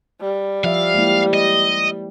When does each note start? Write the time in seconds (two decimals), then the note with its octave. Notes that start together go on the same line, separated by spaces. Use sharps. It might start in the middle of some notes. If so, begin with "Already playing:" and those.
0.21 G3
0.64 F3 E5 F5
0.94 G#3 A#3 E4
1.34 D#5